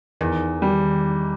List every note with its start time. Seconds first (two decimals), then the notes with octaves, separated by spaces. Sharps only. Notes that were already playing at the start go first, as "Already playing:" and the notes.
0.21 E2 D#3
0.62 G3